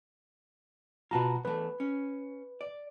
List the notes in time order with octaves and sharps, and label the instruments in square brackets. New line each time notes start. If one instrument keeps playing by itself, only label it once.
[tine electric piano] B2 A5 A#5 [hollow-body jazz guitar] F4 F#4 B4
[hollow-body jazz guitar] E2 A3 [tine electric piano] B4
[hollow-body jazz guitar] C#4
D5